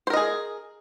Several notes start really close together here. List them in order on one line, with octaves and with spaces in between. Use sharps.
C5 A#4 D#5 G#4